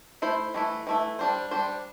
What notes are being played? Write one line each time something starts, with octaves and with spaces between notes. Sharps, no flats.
A3 E4 C5
E3 A3 E4
E3 A3 E4
G3 D4 C5
G3 D4 C5